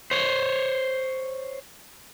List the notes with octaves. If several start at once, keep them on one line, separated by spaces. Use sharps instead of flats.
C5 C#5